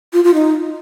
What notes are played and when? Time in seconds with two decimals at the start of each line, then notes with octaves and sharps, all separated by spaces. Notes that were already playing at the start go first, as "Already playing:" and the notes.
0.13 F4
0.24 F4
0.34 D#4